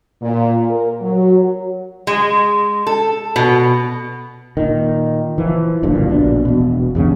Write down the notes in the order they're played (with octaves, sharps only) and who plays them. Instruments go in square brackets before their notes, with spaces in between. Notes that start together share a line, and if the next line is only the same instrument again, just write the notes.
[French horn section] A#2
A#4
F#3
[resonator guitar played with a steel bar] G#3
A4
B2
[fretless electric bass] A#2 D#3
E3 F3
F#1 D2 G2 A#2
A#1 B2 D4
E1 B2
E2 G2 C#3